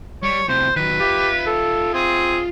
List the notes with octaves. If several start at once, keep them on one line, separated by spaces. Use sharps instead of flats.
G3 C#5
A2 C3 C5
D#3 F#3 B4
F4 G4 E5
A4
C4 G#4